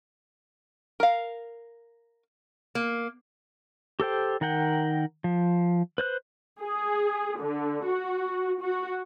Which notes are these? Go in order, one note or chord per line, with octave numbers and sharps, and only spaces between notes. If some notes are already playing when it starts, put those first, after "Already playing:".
A#4 F5
A#3
G4 A4 C5 G5
D#3 A#4 F#5 G5
F3
B4 C5 F#6
G#4
D3
F#4
F#4